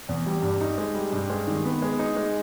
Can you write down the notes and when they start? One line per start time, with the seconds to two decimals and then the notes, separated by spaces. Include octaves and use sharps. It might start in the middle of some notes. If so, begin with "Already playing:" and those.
0.09 E2
0.26 G3
0.42 G2
0.61 D#4
0.78 G#3
0.94 G3
1.12 G2
1.30 G#3
1.47 D#3
1.65 B3
1.82 G#3
1.99 D#4
2.16 G#3